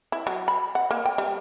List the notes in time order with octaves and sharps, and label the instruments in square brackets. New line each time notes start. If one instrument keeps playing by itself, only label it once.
[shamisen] E4
F#3
B5
F#5
A#3
G5
G3